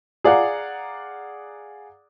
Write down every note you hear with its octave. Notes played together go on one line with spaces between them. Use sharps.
G#4 D5 F5 F#5 A#5